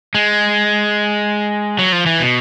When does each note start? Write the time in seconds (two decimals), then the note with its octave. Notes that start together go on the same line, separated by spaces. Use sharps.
0.15 G#3
1.79 F#3
1.92 F3
2.06 E3
2.20 B2